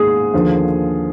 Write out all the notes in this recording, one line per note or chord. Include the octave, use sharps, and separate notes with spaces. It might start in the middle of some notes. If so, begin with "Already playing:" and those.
Already playing: G#2 D#3 A#3 G#4
D#2 D3 F3